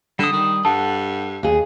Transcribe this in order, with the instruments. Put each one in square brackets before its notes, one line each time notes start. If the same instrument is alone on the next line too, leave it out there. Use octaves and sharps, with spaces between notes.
[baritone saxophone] D3 [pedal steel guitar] G3 D#6
[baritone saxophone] D#3
[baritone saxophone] G2 [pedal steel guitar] A4 F#5 [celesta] A5
[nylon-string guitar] D#2 G#4